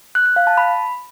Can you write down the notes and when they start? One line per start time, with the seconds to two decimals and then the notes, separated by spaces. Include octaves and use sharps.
0.15 F#6
0.26 F#6
0.36 F5
0.47 A5
0.58 B5